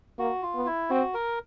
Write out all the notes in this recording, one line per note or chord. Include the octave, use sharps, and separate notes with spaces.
A#3 F#4
F4
B3
E4
C4 F#4
A#4